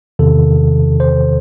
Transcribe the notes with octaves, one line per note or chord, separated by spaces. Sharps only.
E2 C3 D#3 A4
C5